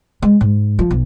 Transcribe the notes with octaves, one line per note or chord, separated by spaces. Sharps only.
G#3
G#2
F3
B1